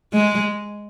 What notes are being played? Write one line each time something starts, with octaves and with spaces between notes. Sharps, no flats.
G#3